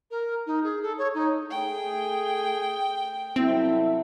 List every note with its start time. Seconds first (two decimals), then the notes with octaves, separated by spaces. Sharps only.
0.10 A#4
0.46 D#4
0.63 G#4
0.82 A4
0.97 C#5
1.14 D#4
1.50 A3 G#4 G5
3.36 C2 F#3 C4 E4 A4 E5